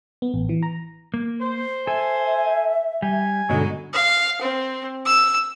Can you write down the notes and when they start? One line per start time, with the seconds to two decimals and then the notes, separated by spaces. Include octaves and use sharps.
0.22 B3
0.34 A1
0.49 E3
0.63 A#5
1.14 A#3
1.40 C5
1.87 A4 E5 G#5
3.02 G3 G#5
3.49 G2 B2 D3 F#3 G#3 D#4
3.94 F5
4.41 C4
5.06 E6